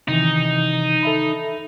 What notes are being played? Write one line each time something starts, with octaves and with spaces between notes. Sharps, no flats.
C3 D#3 E3 D#4
A4 E5 B5